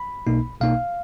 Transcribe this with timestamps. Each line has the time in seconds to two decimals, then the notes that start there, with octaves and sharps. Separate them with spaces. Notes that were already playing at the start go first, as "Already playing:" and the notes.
Already playing: B5
0.27 B1 B2 A#3 D#4
0.61 B1 B2 A#3 D#4 F5